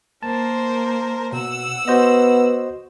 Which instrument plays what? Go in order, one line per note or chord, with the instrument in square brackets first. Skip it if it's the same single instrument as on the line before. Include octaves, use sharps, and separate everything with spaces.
[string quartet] A#3 A#4 C5 [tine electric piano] A5
[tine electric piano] B2 [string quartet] F#5 E6
[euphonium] B3 [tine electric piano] F#4 C5 D#5